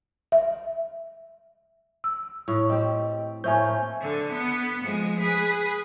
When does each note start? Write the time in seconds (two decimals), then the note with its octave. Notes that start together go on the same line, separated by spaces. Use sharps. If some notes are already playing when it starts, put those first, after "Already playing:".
0.32 E5
2.04 E6
2.48 A2
2.69 C4 G4 D#5
3.44 A2 A3 A#3 C5 E5 G#5 G6
4.00 D3
4.32 B3
4.82 F3 G#3
5.19 G#4 B4